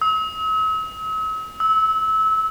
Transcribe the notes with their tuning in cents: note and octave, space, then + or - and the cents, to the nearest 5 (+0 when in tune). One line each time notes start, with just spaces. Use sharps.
E6 -45
E6 -25